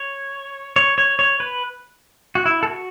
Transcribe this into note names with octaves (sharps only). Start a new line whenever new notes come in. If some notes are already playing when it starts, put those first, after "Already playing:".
Already playing: C#5
C#5
C#5
C#5
B4
F#4
E4
A4
F#4